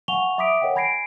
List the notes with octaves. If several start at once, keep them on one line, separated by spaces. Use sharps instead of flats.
F5 F#5 G#5 C#6 F7 G7
E5 B5 D6 D#6 B6 D7
A#4 C#5 D#5 F#5 G5
G#5 B5 G#6 A#6 C7 D7